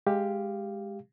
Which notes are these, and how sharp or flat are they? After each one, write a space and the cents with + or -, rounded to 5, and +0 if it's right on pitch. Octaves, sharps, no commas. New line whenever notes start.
G#3 +0 G4 +10 F5 -10